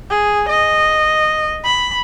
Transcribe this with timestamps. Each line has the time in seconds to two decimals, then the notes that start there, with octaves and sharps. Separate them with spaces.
0.10 G#4
0.49 D#5
1.64 B5